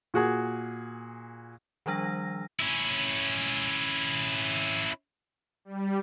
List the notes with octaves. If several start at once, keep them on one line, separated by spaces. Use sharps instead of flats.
A#2 F#4 G#4
D#3 F3 G3 D4 E6 A#6
C#4 E4
G3